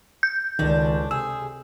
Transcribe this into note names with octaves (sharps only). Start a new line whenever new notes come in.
G6
C#2 A2 D#3 D4
C3 G#4 E6